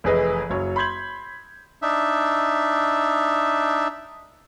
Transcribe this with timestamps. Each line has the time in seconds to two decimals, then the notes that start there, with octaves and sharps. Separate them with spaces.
0.04 F1 E3 G#4 B4 D#5
0.50 F#1 F#3 C#5 C#6
0.76 B5 C6 G6 G#6 F#7
1.82 D4 D#4 E5